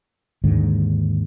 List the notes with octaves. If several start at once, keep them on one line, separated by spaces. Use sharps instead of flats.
D#2 G#2 D3